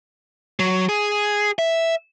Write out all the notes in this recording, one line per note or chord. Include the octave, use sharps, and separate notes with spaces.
F#3
G#4
E5